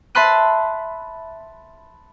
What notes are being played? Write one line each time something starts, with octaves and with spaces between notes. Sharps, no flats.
E5 A5 B5 C6 F#6 D#7